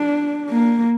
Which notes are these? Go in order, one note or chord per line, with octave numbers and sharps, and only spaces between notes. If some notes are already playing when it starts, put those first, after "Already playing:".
Already playing: D4
A#3